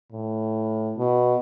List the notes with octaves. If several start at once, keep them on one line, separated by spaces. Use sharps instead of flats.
A2
B2